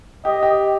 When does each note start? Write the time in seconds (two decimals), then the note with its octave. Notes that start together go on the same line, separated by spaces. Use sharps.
0.25 G4 D#5
0.43 G4